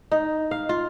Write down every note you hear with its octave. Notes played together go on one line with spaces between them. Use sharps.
D#4
F5
F4